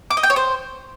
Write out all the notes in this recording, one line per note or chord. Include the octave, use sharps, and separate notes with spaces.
D6
D#5
G5
C#5
C5